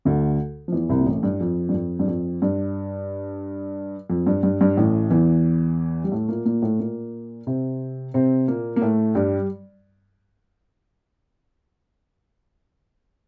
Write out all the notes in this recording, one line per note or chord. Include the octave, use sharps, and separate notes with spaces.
D2 D3
F3
E2 E3
C2 C3
A#2
A1 A2
G2
F2
G2
F2
G2
F2
G2
F2
G2
G2
G2
A1 A2
E2 E3
G3
A2 A3
A#2 A#3
A#2 A#3
A2 A3
A#2 A#3
C3 C4
C3 C4
A#2 A#3
A#3
A2 A3
G2 G3